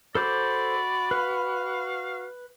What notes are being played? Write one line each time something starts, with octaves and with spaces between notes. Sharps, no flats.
F#4 A4 C5 D5 B5 D6
B4 F5